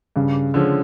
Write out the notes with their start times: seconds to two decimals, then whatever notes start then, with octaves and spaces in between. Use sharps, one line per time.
0.16 G2 C#3
0.54 D3 F3 G#3 C#4